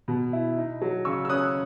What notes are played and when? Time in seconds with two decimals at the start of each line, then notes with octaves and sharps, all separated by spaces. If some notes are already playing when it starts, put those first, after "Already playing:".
0.08 B2
0.33 E4
0.58 D#4
0.81 F#3
1.05 C#3 C#6 E6
1.25 E6
1.29 C#4 D#6 F#6